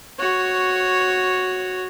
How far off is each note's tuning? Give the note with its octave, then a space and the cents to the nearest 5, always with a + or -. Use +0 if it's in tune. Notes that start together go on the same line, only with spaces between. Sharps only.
F#4 +0 C#5 +0